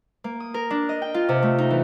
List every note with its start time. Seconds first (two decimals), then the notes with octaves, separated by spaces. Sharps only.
0.24 A#3
0.40 D#6
0.54 A#4
0.70 D4
0.89 D#5
1.02 G5
1.14 F4
1.29 C3
1.42 A3
1.58 D#4
1.70 E3